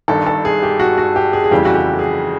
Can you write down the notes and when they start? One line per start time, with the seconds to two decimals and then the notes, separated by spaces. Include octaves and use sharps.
0.08 G1 G2 D#3 A4
0.27 A4
0.45 G#4
0.63 G4
0.80 F#4
0.98 F#4
1.16 G4
1.33 G#4
1.44 G#4
1.51 F1 F2 C#3 E3 G3 G4
1.65 F#4
1.74 G4
1.99 G#4